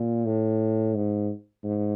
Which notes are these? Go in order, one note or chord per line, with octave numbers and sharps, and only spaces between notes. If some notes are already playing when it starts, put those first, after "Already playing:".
Already playing: A#2
A2
G#2
G#2